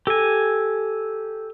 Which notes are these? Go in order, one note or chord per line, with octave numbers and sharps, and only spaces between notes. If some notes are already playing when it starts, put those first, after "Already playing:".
G4 A4 G#5